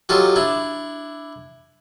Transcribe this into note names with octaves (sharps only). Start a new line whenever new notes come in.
F#3 D#4 F4 G4 A4
D4 E4